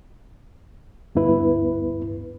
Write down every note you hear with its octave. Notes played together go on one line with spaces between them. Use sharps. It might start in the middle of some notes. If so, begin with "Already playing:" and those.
D2 G2 B3 E4 B4